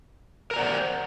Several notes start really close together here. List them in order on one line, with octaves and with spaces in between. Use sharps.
A#4 A#5 D5 F#5 C5